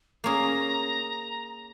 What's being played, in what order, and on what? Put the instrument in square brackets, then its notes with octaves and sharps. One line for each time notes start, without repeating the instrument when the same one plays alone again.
[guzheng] A#3 C#4 G#4 [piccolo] A#5